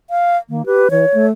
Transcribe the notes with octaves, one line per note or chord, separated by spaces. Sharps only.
F5
D#3 A#3
G4 B4
E3 C#5
A3